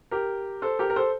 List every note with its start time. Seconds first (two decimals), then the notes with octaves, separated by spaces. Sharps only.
0.11 G4 A#4
0.62 A4 C5
0.79 G4 A#4
0.90 A#4
0.96 A4 C5